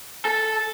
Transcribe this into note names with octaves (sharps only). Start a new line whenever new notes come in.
A4